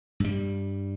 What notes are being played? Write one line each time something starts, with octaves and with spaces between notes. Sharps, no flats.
G2 G3